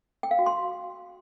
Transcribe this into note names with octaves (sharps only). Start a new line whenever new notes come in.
G5
F5
F#4
C6